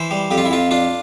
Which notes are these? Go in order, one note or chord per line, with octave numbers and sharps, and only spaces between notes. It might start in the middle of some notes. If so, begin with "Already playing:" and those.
Already playing: E3 C5
G3
F2 G4
F4
E4
F2 F4
D4 F4